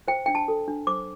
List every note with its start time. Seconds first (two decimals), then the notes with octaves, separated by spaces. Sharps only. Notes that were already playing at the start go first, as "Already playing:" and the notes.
0.08 C5 G5
0.26 D4 G5
0.35 A5
0.48 A4
0.68 D4
0.87 C5 D6